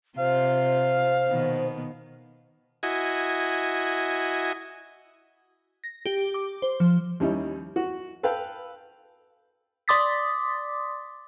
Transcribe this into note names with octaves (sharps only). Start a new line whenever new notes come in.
C3 F4 C5 F5
B2 D#3 B3
E4 F#4 D#5 G#5
A#6
G4
D6
C5
F3
D#2 G3 C#4 D#4 E4
F#4
A4 B4 F5 G5
D5 C6 D6 D#6 A6 B6